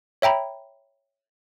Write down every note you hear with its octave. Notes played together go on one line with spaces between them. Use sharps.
C#5 E5 G5 A#5 B5